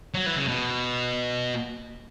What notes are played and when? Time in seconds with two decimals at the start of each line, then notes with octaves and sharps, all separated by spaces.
0.14 F#3
0.26 E3
0.36 C#3
0.48 B2